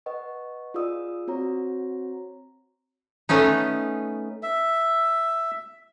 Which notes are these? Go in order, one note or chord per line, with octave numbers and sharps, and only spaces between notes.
B4 D#5 F#5 C#6
F4 G#4 D5 F5 D#6 E6
C4 F#4 C#5 A#5
A3 B3 C#4 D#4
E5